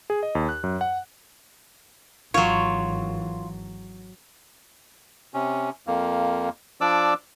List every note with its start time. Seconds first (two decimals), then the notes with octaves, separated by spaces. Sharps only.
0.10 G#4
0.23 D#5
0.35 D#2
0.49 F#6
0.64 F#2
0.81 F#5
2.34 G#1 E3 F#3 F4 C#5
5.34 C3 C#4
5.87 F2 A#3
6.81 F3 D4 D5 D6 E6